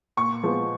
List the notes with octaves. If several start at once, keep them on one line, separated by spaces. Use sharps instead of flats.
A#2 C#6
F3 G#3 B3